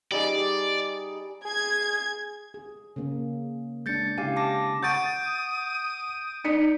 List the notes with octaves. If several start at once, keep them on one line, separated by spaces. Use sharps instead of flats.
G3 D#4 G#4 D5
G#4 G#6
G#4
C#3 A#3
G#3 D4 G6 A6 C#7
C#3 E4 G4 F5 G#5
A5 D6 A#6
F#5 C#6 D#6 G6 A6 D7
D#4 D5 B6 C#7